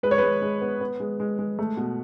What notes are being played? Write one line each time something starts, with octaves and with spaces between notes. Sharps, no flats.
G#3 B4
C#5
G#3 B4
G#3
B3
B3
G#3
G#3
G#3
A3
B2